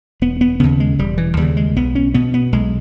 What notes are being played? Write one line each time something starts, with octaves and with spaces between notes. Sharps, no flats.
E1 B3
B3
D#2 C#3 B3
G#3
E1 G3
E3
D#2 C#3 G3
G#3
B1 B3
C#4
B2 B3
B3
B1 G#3